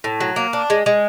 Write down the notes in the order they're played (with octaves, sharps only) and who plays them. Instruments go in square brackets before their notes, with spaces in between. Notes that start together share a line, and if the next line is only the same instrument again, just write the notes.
[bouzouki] A2
F#3
A#3
D4
G#3
G#3